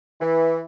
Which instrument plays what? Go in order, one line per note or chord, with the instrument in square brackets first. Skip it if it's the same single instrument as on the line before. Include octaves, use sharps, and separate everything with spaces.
[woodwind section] E3